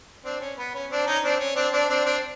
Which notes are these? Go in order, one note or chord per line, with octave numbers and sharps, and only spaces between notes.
C4 D4
C#4
B3
C#4
C4 D4
C#4 D#4
C4 D4
C#4
C4 D4
C4 D4
C4 D4
C4 D4